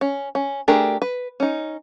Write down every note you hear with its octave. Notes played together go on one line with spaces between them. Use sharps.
C#4
C#4
A3 D4 G4 G#4 A#4
B4
C#4 D#4